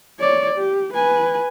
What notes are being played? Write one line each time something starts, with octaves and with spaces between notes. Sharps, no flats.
C#5 D5
G4
B4 G#5